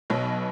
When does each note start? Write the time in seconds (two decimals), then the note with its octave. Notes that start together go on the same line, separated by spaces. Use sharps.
0.10 B1 B2 F#3